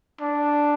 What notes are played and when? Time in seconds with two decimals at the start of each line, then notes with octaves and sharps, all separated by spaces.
0.21 D4